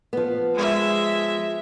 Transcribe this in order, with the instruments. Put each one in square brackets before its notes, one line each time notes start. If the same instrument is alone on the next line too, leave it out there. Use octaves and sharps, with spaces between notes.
[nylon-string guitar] F3 B3
[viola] G#3 E5